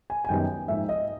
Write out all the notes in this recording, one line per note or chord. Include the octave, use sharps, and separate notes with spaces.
G#5
G#5
F#2 D#3 G3 B3 G5
G#2 F3 A#3 D#4 E5
D#5